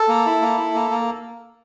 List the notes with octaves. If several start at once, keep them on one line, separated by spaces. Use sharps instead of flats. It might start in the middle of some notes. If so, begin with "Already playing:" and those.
Already playing: A4
A#3
E4
A#3
E4
A#3
A#3